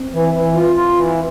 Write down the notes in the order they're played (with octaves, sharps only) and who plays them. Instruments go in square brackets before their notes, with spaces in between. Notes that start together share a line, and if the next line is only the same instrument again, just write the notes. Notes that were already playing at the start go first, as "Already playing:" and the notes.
Already playing: [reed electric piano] C4
[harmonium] E3
E3
F4
F4
E3